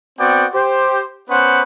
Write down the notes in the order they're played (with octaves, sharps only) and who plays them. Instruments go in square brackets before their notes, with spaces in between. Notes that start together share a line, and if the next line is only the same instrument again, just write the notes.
[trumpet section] B3 C4 F#4 D5 G5
G4 C5
B3 C#4 B4 C5 F#5